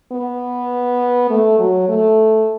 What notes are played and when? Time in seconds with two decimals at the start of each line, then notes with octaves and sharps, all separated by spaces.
0.12 B3
1.30 A3
1.59 F#3
1.89 A3